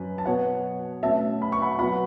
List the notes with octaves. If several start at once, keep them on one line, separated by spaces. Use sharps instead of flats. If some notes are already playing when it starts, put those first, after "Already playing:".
Already playing: F#2 C#4 B4
A5
B2 B3 C#5 F#5
B2 A3 C#4 E5 A5
B5
C#6
F#5 B5
B2 F#3 B3 F#5 B5